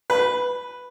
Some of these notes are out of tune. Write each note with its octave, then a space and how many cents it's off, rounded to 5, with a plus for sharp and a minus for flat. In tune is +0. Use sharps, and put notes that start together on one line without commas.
B4 +0